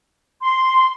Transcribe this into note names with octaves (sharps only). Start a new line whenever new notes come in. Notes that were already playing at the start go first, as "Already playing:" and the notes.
C6